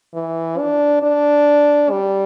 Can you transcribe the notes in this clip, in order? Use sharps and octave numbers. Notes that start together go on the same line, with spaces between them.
E3
D4
D4
G3